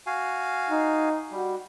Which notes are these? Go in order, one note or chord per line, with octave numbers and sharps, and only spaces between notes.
F#4 F5 G#5
D#4
G3 F#4